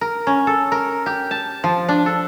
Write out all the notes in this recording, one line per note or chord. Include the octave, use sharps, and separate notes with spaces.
A#4
C#4
A4
A#4
G4
A5
F3
D4
A4